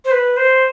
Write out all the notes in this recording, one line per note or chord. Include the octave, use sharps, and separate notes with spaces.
C5
B4
C5